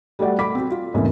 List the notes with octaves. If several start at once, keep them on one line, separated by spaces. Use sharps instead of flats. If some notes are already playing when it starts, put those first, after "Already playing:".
G3 A3 F#4 D5 F#5
A3 B5 D6 B6
C4 F#4
F4
E2 G#2 C3 A3 A#3 C#4